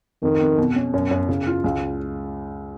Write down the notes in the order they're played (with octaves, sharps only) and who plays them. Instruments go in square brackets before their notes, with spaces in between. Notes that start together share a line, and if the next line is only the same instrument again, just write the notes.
[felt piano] F2 [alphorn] D#3
[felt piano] F2
B2
C#4
F#2
F#2
C#3
F4
C#2